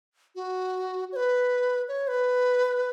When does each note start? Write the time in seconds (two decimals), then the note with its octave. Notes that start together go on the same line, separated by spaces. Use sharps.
0.35 F#4
1.12 C#5
1.16 B4
1.88 C#5
2.08 B4